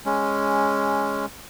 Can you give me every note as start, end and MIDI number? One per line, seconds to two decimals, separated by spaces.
0.06 1.26 56
0.06 1.26 61